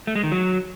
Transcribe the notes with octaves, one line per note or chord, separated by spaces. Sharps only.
A3
G#3
D#3
F#3